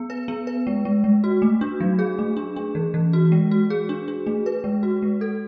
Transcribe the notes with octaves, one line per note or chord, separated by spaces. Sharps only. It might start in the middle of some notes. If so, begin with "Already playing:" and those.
Already playing: B3
B4
B3
B4
G#3
G#3
G#3
F#4
A3
D4
F#3
G#4
A3
D4
D4
E3
E3
F#4
G#3
F#4
G#4
D4
D4
A3
B4
G#3
F#4
G#3
A4